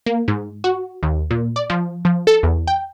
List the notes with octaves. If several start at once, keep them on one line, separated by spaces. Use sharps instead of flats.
A#3
G#2
F#4
D#2
A#2
D5
F3
F3
A4
E2
G5